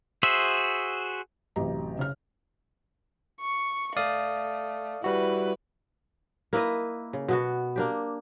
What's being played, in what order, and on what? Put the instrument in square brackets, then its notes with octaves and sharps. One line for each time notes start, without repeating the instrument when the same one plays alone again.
[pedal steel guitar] F#4 G#4 C5 E5
[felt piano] A1 F#2 C3 G4 D#5 A#5
C#3 F6
[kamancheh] C#6
[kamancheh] A3 [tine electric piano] D5 F5 D#6
[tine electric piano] G3 F#4 [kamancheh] E4 B4
[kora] A#3 E4 B4 D#5
C#3
B2 B3 F#4
A#3 D4 G4